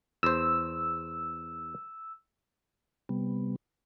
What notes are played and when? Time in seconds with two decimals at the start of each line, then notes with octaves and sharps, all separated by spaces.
0.23 E2 C5 E6
3.09 C3 G3 B3